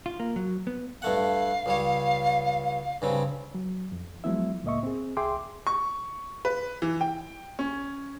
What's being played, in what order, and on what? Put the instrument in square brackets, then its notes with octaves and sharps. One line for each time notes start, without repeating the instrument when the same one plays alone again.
[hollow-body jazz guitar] F4
A#3
F#3
B3
[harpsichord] G2 A3 F#5 [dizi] F5
[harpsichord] C#2 G3 C#5
G2 C#3 C4
[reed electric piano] F#3
F2
F3 F#3 G#3 B3 E4 E5
C#2 A2 A#3 D#5 E5 C#6
C4 G#4
C2 G#4 E5 G5 C6 D6
[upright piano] C#6
B4
E3
G5
C#4